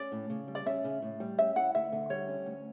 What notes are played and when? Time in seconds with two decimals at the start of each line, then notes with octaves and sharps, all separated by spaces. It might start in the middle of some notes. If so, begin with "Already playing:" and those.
Already playing: C#4 D5
0.12 A2
0.30 C#3
0.48 G3
0.55 D5
0.66 C#4 E5
0.84 C#3
1.02 A2
1.20 G3
1.38 C#4 E5
1.56 E4 F#5
1.75 D2 E5
1.92 D3
2.10 G3 C#5
2.28 C#4
2.46 D2